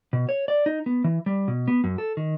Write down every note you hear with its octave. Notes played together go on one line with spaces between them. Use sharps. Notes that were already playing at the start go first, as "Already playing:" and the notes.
B2
C#5
D5
D#4
B3
E3
G3
B2
B3
F#2
A4
D#3